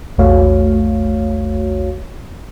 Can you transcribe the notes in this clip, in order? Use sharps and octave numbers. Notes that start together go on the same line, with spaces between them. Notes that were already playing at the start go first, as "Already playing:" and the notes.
A#1 E2 A3 F#4 C#5 F5